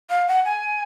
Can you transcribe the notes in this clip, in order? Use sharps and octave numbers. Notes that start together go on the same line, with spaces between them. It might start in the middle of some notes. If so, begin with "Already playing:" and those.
F5
F#5
G#5